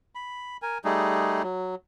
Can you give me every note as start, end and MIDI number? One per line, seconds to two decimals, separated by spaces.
0.15 0.57 83
0.62 0.78 70
0.62 0.78 80
0.85 1.43 55
0.85 1.43 57
0.85 1.43 63
0.85 1.43 68
1.43 1.75 54